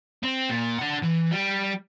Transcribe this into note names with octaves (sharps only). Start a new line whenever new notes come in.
C4
A#2
D4 F#5
E3
G3